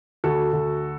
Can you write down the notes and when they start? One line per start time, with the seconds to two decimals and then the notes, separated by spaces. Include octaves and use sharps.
0.24 D2 F#4 A4
0.53 D2